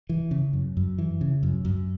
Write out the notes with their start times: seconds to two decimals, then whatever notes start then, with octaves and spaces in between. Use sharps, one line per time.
0.09 E3
0.31 C#3
0.53 F#2
0.77 F#2
0.98 E3
1.21 C#3
1.43 F#2
1.65 F#2